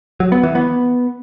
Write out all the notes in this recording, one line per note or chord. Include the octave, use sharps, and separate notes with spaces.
F#3
B3
E3
B3